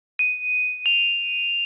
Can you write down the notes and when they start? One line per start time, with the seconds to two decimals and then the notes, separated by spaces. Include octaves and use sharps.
0.19 D#7
0.86 F7